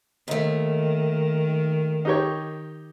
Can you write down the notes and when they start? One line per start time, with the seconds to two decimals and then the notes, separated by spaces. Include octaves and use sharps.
0.28 D#2 D#3 A3
2.05 D#4 G4 C#5